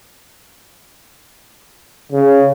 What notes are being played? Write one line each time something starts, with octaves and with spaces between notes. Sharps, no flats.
C#3